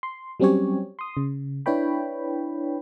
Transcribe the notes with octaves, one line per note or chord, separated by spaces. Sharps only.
C6
F#3 G3 C4 C#4 G4 C#5
C6 D#6
C#3
D4 E4 B4 C#5 G5 B5